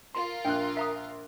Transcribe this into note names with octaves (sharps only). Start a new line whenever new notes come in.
F4 A#4 C6
A#1 G5 F#6
E5 A#5 D#6